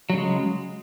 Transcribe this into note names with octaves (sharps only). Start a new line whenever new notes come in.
C#3 F#3 G#3